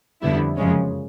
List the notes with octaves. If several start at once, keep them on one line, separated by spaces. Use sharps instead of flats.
F2 D3 G3 B3 E4
F#2 C#3 F3 G#3 C#4